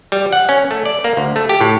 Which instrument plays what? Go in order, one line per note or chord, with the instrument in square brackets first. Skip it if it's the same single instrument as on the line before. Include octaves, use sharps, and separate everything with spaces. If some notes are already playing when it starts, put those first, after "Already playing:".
[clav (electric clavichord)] G3
F#5
C#4
A3
D5
A#3
D2
A3
G4
A2